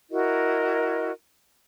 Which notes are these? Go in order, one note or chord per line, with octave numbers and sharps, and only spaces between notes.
E4 F#4 A#4 D#5